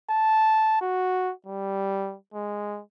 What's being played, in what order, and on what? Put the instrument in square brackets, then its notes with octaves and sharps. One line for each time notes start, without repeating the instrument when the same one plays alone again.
[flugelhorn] A5
F#4
G3
G#3